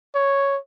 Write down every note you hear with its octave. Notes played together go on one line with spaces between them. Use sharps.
C#5